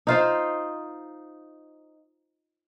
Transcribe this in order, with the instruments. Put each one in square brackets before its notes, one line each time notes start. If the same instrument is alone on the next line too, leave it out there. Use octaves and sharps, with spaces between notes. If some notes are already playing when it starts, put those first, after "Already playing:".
[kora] D#4 F4 C5